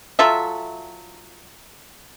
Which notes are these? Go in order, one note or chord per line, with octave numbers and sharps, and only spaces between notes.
F#3 F4 A4 E5